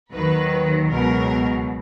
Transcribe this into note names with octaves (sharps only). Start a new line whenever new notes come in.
D#2 D#3 F#3 B4
C#2 B2 F#3 A#4